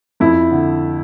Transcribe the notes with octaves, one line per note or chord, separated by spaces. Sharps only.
F2 E4
D3